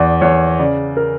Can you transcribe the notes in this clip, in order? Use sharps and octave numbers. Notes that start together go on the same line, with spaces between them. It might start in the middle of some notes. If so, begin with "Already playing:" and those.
Already playing: E2 D5
E2 C#5
C#3 D5
A#4